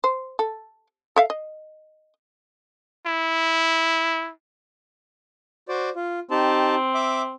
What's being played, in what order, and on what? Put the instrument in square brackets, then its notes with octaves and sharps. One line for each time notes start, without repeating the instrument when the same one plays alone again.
[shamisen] C5
A4
A4 E5 F5
D#5
[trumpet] E4
[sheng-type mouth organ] F#4 C5 D5
F4
[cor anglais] C4 [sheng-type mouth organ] D#4 G4 A5
[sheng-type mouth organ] E5 D6